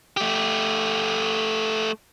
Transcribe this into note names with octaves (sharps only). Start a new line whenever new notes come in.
A3 G4